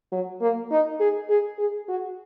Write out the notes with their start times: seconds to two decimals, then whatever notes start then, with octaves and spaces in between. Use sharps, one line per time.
0.12 F#3
0.42 A#3
0.71 D#4
1.00 G#4
1.30 G#4
1.59 G#4
1.89 F#4